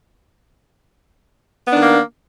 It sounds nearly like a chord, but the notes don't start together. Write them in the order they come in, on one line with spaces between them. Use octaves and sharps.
B3 D4 D#3 A#3